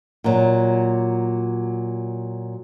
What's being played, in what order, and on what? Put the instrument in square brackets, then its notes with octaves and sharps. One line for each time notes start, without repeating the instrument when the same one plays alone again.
[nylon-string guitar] A#2 F#3